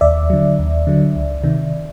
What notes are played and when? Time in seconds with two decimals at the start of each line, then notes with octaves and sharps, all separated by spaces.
0.01 D#2 D5 E5
0.30 D3 F#3
0.59 D#2
0.87 D3 F#3
1.16 C#2
1.44 C3 D#3